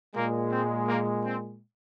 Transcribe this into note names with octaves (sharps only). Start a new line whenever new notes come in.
A#2 G#3 A#3
C4
A#3
C4